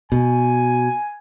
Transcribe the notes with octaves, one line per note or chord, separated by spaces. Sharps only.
B2 G#5